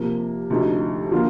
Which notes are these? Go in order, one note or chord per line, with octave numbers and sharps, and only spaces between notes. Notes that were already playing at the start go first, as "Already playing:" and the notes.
Already playing: C3 F3 A#3
D2 C3 F3 A3 D#4
D3 F3 A#3 F4